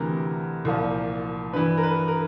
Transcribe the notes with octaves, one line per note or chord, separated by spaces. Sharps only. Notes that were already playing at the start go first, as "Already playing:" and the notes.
Already playing: D2 C3 E3 A#4
C2 A#2 F3
G2 E3 B4
A#4
B4
A#4